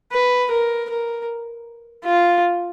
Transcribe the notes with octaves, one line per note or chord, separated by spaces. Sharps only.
B4
A#4
A#4
F4